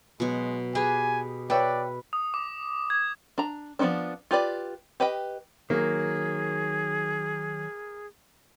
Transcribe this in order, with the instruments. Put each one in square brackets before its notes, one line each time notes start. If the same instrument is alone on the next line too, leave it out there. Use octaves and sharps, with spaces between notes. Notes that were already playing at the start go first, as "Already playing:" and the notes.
[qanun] B2 F#3 [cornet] G#3
[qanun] G4 G#4 B4 [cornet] G#5
[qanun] B4 [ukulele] C#5 E5 G5 [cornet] D5
[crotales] D#6
D6
G#6
[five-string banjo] D4 A#5
F3 G3 B3 C4 D4
F4 G4 B4 D5
G4 B4 D#5 G5
[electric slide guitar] D#3 F#3 [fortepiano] A#3 [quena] G#4